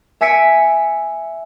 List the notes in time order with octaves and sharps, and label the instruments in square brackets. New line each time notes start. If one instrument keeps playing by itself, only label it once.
[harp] E5 G#5 E6 B6 C#7 D7